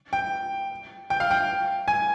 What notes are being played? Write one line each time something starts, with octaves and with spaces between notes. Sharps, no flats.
G5
G5
F5
G5
G#5